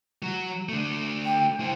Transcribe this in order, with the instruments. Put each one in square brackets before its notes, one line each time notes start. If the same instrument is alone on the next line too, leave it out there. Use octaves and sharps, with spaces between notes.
[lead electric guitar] F#3 F#4
A3 D4
[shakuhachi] G5
[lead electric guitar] E4 C5